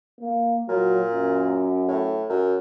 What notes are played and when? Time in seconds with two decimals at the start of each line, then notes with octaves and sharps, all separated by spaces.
0.20 A#3
0.69 A#2 F#3
1.12 F#2
1.88 A2
2.29 F#2